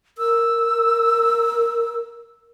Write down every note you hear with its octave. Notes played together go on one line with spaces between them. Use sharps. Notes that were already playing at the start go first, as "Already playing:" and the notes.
A#4 E6